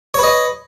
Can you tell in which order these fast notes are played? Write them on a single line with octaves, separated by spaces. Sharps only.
C#5 B4 D#5